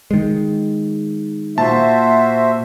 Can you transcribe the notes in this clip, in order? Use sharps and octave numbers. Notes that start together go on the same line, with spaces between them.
D#3 G#3
A#2 F#4 C5 E5 A5